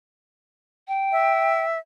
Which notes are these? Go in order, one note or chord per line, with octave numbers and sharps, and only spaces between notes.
G5
E5